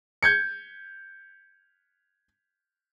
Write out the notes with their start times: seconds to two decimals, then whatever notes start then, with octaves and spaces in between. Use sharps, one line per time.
0.23 G6 G#6 C#7